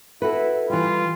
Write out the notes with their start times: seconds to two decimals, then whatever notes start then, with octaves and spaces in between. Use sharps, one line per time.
0.22 E4 F#4 A4 B4
0.70 E3 G3 F4